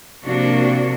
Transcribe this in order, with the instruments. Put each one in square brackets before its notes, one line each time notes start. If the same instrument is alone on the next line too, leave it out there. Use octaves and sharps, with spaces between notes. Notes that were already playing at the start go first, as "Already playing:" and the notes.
[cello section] C3 F3 A#3 D4 F#4